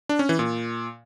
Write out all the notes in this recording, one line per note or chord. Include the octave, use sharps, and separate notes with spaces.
D4
C#4
E3
A#2